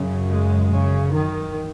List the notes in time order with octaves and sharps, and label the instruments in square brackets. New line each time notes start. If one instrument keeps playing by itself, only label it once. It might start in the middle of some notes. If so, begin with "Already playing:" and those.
Already playing: [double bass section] F#2 C#3
G#3
C#3
D#3